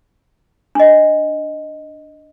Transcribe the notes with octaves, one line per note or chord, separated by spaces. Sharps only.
D4 D#5